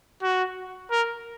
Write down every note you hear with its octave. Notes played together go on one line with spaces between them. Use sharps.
F#4
A#4